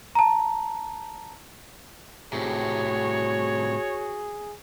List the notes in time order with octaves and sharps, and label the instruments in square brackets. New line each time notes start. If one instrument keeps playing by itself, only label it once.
[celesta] A5 A#5
[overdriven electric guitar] A2 C3 [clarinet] F#4 [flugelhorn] G#4 [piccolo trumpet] C#5